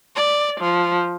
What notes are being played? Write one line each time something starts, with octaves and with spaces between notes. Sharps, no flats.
D5
F3